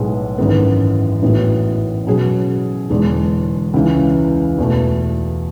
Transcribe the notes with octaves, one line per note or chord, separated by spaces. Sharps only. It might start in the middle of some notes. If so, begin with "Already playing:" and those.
Already playing: B1 A2 G#3 B3
G#1 F#2 E3 G#3 B3
A1 A2 E3 B3 F#4
B2 F#3 C#4 G#4
E1 E2 D3 G#3 D4
C#2 C#3 E3
E2 B2 A3